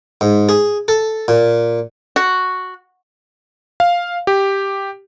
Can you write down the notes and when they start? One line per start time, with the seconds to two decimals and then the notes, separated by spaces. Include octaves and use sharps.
0.21 G#2
0.49 G#4
0.88 A4
1.28 A#2
2.16 F#4
3.80 F5
4.27 G4